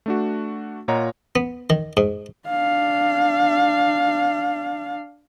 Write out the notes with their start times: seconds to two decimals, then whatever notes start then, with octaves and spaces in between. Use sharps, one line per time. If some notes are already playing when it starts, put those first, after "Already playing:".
0.06 A3 D4 F#4
0.88 A#2 F4 C#5 D#5 F#5 A#5
1.36 B3
1.70 D#3
1.97 G#2
2.49 D4 F5